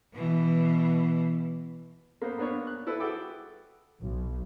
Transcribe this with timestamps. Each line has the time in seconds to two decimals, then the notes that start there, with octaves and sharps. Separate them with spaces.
0.14 B2 E3
2.22 A#3 B3 C5
2.38 A#3 B3 D4 C#5
2.67 F#6
2.87 E4 A4 B4
3.00 F#4 G#4 A4 G5 D6
4.02 B1